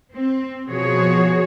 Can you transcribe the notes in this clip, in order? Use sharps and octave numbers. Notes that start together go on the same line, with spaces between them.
C4
B2 F3 F#4 G#4 C#5